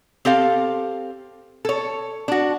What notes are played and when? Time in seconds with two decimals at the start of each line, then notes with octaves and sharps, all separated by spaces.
0.25 C4 G4 A4 F5
1.65 A4 C#5
2.28 D4 F#4